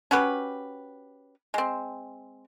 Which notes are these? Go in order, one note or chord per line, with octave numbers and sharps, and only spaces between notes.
C#4 F#4 G4 B4
G#3 C4